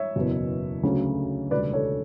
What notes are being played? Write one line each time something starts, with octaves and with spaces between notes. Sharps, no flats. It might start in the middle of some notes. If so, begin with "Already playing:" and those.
Already playing: C#5 E5
F#1 E2 B2
D2 C#3 F#3 A3 C#4
E1 D2 C#3 G3 B4 D5
A4 C#5